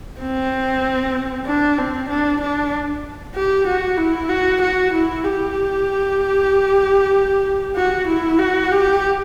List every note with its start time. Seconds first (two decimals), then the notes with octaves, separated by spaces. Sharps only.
0.20 C4
1.46 D4
1.78 C4
2.09 D4
2.41 D4
3.35 G4
3.67 F#4
3.97 E4
4.29 F#4
4.62 F#4
4.93 E4
5.24 G4
7.76 F#4
8.08 E4
8.39 F#4
8.72 G4